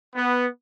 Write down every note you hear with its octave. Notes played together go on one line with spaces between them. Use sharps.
B3